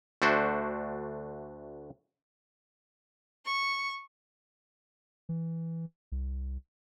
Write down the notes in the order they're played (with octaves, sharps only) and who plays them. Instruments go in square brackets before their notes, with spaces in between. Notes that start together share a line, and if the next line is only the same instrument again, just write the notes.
[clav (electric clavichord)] D2 A3 D4 F#4 C5
[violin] C#6
[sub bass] E3
C2